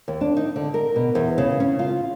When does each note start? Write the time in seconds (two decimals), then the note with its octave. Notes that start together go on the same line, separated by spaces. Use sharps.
0.08 D#2
0.21 D4
0.37 D#4
0.56 D3
0.74 A#4
0.96 B2
1.15 E2
1.38 C#3
1.60 C#4
1.79 F4